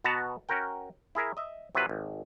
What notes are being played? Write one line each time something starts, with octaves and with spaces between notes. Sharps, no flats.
B2 B3 F#4 A5 A#5
C#4 F#4 A#4 G5
E4 G#4 A#4 E5
D#5 E5
C3 F#3 E4 F4 B4
G#1